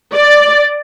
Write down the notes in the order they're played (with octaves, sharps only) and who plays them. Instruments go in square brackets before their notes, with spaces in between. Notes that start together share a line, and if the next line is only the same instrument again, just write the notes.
[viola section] D5